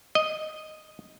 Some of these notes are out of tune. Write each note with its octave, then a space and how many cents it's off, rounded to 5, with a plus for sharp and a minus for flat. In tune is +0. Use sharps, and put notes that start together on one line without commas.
D#5 +0